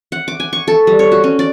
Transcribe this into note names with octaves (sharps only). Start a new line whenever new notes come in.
F#5
D6
G#5
C#6
A4
G3
C#5
F#4
C#4
D5